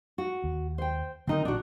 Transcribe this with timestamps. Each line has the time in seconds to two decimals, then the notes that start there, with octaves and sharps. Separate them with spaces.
0.18 F#4
0.44 D#2
0.78 C5 G5
1.27 D3 D#3 A#3 C4 D#4 A#4
1.45 A1 A#2 D4 F#4